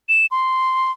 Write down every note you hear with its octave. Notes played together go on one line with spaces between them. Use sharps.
E7
C6